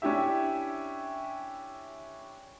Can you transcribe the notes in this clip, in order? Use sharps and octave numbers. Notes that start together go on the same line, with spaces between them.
C#4 D4 E4 G4 E5